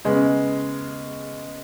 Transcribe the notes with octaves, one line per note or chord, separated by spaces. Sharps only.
C#3 G#3 B3